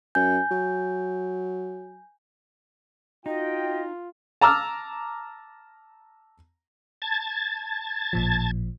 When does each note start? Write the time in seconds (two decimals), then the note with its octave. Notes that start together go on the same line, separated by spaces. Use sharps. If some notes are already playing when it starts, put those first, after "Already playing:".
0.15 F#2 G#5 G6
0.51 F#3
3.26 D#4 F4 F#4 D#5 G5
4.41 A5 A#5 D6 E6 F6
7.02 A5 G#6 A6
8.13 A1 A#2 F3